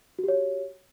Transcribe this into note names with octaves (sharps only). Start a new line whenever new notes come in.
F#4 G4 C#5